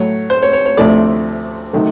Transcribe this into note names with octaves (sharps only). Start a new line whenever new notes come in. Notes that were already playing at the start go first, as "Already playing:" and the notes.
Already playing: A2 F#3 A3 C#5
C5
C#5
C#5
C#5
D2 C3 F3 A3 D5
C3 D#3 F#3 A3